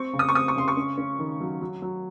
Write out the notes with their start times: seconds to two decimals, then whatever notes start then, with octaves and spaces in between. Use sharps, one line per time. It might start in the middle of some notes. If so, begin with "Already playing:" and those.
Already playing: C4 C#6
0.13 C#3
0.19 D#6
0.29 C#6
0.34 C4 D#6
0.48 C#6
0.56 C#3 C6
0.68 C#6
0.77 C#4
0.98 C#4
1.19 D#3
1.41 F#3
1.62 F#3
1.82 F#3